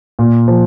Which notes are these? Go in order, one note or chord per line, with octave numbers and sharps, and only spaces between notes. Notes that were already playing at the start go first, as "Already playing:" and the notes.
A#2
F3